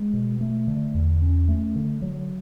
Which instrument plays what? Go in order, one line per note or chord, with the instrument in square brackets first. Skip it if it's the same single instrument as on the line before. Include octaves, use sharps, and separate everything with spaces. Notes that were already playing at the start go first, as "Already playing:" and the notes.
Already playing: [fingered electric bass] G#3
B2
A3
D3
E2
C#4
A3
D3
F#3